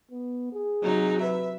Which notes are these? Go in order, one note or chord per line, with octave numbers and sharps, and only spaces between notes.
B3
G#4
C3 F#3 D#4
B4 E5